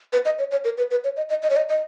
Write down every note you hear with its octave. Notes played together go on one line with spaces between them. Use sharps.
B4
D#5
C#5
C#5
A#4
B4
B4
C#5
D#5
D#5
D#5
C#5
D#5
D#5